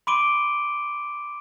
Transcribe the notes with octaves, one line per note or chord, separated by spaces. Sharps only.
B5 C6 D6 D7 D#7 G7